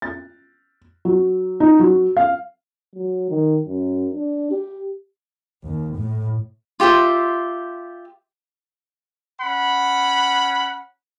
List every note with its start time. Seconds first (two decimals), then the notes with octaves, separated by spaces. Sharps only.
0.02 A6
1.05 F#3
1.60 D#4
1.80 F#3
2.17 F5
2.95 F#3
3.30 D#3
3.66 F#2
4.13 D4
4.51 G4
5.66 D#2
5.98 A2
6.80 F4 G4 C5 E5
9.40 C#4 F#5 B5